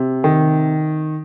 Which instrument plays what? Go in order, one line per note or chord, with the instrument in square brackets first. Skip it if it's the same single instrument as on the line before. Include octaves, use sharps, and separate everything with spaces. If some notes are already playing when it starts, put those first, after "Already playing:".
Already playing: [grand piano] C3
D#3